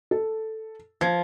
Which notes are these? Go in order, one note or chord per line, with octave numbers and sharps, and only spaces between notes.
A4
F3 G#6